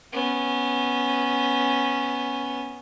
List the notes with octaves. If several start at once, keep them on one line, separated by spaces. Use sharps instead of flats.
B3 C#4